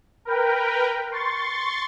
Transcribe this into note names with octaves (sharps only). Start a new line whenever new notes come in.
A#4 B4 G5
C6 C#6 A6